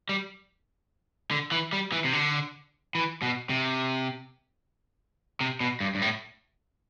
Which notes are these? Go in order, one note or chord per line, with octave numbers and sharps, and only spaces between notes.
G3
D3
E3
G3
E3
C3
D3
E3
B2
C3
C3
B2
G2
G2
A2